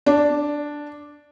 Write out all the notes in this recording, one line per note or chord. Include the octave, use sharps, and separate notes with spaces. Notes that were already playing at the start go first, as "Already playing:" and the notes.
D4